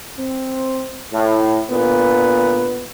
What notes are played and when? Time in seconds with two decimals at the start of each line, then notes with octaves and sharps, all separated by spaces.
0.18 C4
1.12 A2
1.70 A#2 D3 B3